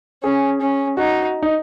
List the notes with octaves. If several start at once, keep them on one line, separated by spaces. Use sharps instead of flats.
C#4 G#4
C#4
D#4 F#4
D#4